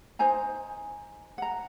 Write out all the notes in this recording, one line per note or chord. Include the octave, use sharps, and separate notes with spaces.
D#4 C5 G#5 A#5
F#5 A#5